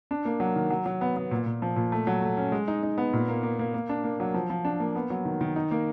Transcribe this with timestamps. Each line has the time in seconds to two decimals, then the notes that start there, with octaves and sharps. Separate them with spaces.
0.11 D4
0.25 A#3
0.40 F#3
0.56 D#3
0.70 F#3
0.86 F#3
1.01 B3
1.16 B3
1.31 A#2
1.46 A#2
1.62 F3
1.76 A#2
1.92 A3
2.07 F#3
2.22 A3
2.37 C#4
2.52 G#3
2.68 D#4
2.83 D#4
2.98 B3
3.13 A#2
3.28 A#3
3.43 A#3
3.59 A#3
3.74 A#3
3.89 D4
4.04 A#3
4.20 F#3
4.34 F3
4.50 F3
4.65 D4
4.80 A#3
4.95 B3
5.10 F#3
5.25 D#3
5.41 D#3
5.56 D#4
5.71 A#3